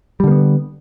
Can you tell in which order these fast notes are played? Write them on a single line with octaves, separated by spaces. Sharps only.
G3 D3 A#3 B3